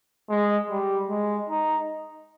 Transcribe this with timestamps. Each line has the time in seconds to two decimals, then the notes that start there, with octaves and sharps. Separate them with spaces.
0.29 G#3
0.70 G3
1.09 G#3
1.50 D#4